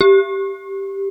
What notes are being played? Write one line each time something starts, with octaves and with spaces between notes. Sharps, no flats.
G4